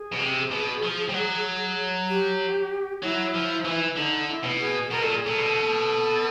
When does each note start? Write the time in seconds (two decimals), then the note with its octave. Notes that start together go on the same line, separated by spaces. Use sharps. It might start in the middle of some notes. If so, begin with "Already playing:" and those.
Already playing: G#4
0.12 B2
0.19 C3
0.51 B2
0.83 F3
1.09 G3
1.13 F#3
2.08 G4
3.03 F#3 E4
3.34 F3
3.65 E3
3.96 D3 D#4
4.29 E4
4.44 B2
4.59 G#4
4.91 B2 A#4
5.02 A#2 A4
5.15 G#4
5.26 A#2 A4
5.38 B2